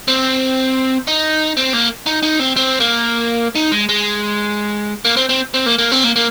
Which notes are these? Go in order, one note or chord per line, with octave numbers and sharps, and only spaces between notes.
C4
D#4
C4
A#3
D#4
D#4
C4
C4
A#3
D#4
G#3
G#3
A#3
C4
C4
C4
A#3
A#3
C4
A#3
A#3